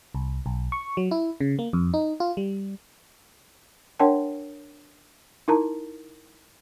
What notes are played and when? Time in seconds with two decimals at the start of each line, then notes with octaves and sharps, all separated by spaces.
0.15 C2
0.46 B1
0.72 C#6
0.97 F#3
1.11 E4
1.40 C#3
1.59 A#3
1.73 F2
1.94 D#4
2.20 F4
2.37 G3
3.99 D4 A#4 C#5 F#5 G5 A5
5.48 D#4 E4 A#4 A5 A#5